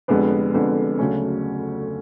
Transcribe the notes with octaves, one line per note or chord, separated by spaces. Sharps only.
F1 F2 D3 G#3 B3
F1 F2 D3 G#3 B3
D2 C#3 F#3 A3 C#4